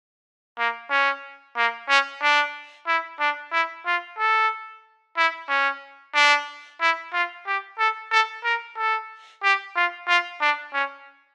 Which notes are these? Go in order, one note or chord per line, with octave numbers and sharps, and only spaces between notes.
A#3
C#4
A#3
C#4
D4
E4
D4
E4
F4
A4
E4
C#4
D4
E4
F4
G4
A4
A4
A#4
A4
G4
F4
F4
D4
C#4